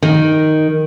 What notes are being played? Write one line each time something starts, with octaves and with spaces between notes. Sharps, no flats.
D#3